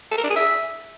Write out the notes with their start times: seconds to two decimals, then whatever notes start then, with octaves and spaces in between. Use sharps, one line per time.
0.12 A4
0.18 A#4
0.24 D4
0.30 G#4
0.36 E5